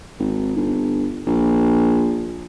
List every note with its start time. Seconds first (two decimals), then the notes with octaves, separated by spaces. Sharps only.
0.19 G#1
0.56 G1
1.27 A#1